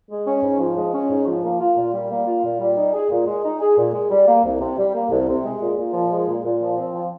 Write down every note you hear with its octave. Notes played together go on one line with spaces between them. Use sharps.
G#3
C#4
G#2
F3
G#3
C#4
G#2
F3
A#3
F4
A#2
G3
A#3
F4
A#2
G3
D#4
G#4
A#2
G#3
D#4
G#4
A#2
G#3
G3
A#3
C2
C3
G3
A#3
C2
C3
G#3
A#2
A#2
F3
G#3
A#2
A#2
F3
C4
F3